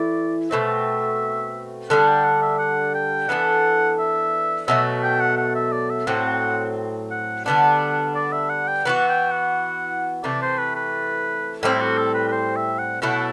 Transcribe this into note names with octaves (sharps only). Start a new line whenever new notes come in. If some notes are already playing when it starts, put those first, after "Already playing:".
Already playing: E3 A3 E4 D5
B2 A3 C4 E5
D3 G3 D4 F#5
G5
F#5
E5
F#5
G5
E3 B3 D4 A4 F#5
E5
B2 F#3 A3 E5
G5
F#5
F#5
E5
D5
E5
A2 F#3 C4 F#5
F#5
D3 G3 B3 D4 F#5
D5
E5
F#5
G5
E3 B3 F#4 F#5
G5
F#5
C3 E3 A3 D5
C5
B4
B4
A2 G3 C4 E4
F#4
A4
B4
B4
C5
E5
F#5
B2 F#3 A3 E4 F#5